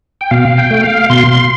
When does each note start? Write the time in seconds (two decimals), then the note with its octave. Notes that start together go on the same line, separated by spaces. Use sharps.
0.21 G5
0.31 B2 F5
0.58 G5
0.71 A3
0.83 F5
1.10 B2 C6